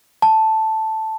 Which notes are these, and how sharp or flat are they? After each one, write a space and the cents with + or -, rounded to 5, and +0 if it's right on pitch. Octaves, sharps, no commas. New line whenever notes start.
A5 +0